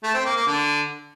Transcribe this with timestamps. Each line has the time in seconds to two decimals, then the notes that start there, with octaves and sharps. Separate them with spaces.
0.03 A3
0.14 C4
0.25 A#3
0.36 A#3
0.46 D3